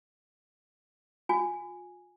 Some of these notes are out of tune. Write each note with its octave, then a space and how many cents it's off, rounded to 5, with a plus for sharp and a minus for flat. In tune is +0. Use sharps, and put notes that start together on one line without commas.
F4 +35 G#5 +0